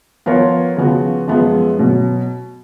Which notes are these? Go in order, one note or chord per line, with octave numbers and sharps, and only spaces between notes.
F3 B3 F4 A#4 C#5
C#3 F3 B3 F#4
F#2 F3 G#3 B3
B2 F#3